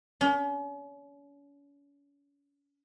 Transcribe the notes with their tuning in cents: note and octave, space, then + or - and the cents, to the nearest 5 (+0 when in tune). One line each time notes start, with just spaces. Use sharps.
C#4 +40